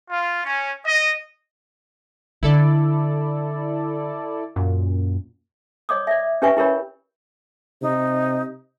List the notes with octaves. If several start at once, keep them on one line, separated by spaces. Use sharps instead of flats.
F4
C#4
D#5
D3 E4 A4 D5
F#2 A#2
C#5 D#5 D6 D#6
D5 E5
C#4 G4 B4 E5 G#5 C#6
E4 G4 A#4 C#5 B5
C3 D#4